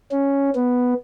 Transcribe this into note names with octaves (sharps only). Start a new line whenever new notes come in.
C#4
B3